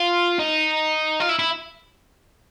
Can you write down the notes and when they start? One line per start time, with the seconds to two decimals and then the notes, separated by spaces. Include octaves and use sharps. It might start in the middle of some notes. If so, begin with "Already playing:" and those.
Already playing: F4
0.39 D#4
1.20 F4
1.29 E4
1.39 E4